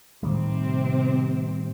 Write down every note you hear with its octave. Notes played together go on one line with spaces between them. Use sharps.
A2 C3 D#3 G3 C4